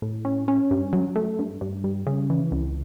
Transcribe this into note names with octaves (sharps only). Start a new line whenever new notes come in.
A2
C#4
C#4
G2
F#3
A3
G2
G2
G3
C#3
E3
C#2